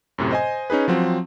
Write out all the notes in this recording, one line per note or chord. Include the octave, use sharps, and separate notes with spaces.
F#2 A2 C3
C5 D#5 G#5
C#4 D#4 G#4 B4
F3 F#3 C4